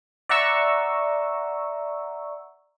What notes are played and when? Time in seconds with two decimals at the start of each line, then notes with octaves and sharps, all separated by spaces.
0.29 D5 E5 F#5 A#5 C#6 E6